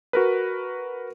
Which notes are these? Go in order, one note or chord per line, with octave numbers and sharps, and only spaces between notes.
F#4 A#4 B4